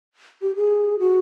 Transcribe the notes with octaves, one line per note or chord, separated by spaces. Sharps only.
G4
G#4
F#4